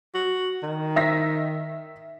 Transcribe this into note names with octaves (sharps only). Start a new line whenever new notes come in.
F#4
D#3
E5 A#6 B6